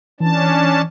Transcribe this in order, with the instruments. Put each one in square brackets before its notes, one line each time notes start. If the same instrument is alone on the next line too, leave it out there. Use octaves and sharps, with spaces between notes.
[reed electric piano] E3 [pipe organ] C#4 D4 A5